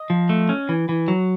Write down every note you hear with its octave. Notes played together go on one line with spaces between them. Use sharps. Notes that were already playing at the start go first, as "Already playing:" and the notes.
Already playing: D#5
F3
A3
C#4
E3
E3
F#3